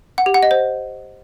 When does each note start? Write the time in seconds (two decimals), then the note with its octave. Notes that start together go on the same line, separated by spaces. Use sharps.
0.18 F#5
0.26 G4
0.34 F#5
0.43 D#5
0.51 C5